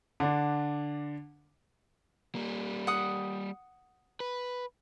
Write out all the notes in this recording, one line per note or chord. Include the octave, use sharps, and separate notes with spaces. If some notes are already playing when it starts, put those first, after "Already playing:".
D3 D4
G3 A#3
F#5 D#6
B4